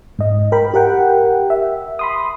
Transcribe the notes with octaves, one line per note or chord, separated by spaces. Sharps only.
G#2 D#5
A#4 G5 B5
G4 A#4 F#5 G5
E5
B5 C6 D#6